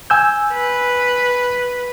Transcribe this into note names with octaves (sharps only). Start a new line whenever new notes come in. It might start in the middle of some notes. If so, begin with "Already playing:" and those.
G#5 E6 G6
B4